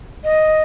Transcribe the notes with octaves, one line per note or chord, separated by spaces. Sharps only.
D#5